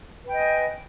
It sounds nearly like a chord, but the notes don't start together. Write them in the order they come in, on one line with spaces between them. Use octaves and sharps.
B4 G5 D#5 G#5